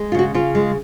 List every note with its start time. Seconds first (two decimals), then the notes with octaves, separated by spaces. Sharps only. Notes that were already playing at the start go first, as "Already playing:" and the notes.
Already playing: G#3
0.12 F4
0.15 C#3 F#4
0.34 C#3 F4
0.55 G#3